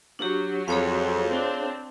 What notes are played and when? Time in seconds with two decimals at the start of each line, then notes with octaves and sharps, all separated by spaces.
0.19 F#3 D4 G4
0.68 F2 G#4 C#5 F5
1.27 C4 D4